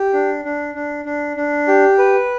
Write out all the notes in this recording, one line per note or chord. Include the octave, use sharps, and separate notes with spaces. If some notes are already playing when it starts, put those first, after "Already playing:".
Already playing: G4
D4
D4
D4
D4
D4
G4
B4